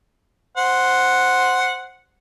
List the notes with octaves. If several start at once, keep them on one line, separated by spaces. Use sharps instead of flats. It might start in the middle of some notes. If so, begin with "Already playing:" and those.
C5 F#5